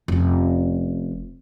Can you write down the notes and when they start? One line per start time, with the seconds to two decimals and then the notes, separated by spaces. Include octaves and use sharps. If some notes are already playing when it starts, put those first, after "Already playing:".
0.08 F1 C#4